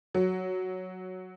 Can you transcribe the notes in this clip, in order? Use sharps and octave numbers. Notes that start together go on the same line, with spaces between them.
F#3